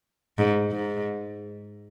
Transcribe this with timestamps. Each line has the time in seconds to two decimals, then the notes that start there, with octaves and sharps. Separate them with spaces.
0.38 G#2
0.71 G#2